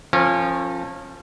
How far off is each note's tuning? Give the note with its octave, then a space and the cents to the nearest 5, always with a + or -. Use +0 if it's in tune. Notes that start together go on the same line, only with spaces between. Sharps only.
F3 +0 C#4 -30 A#4 -45